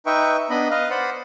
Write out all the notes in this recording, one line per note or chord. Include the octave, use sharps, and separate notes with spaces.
D#4 B4 E5 G5 C#6
B3 D4 D#5 B5
B4 D#5 F5
C5 D5 F#5 B5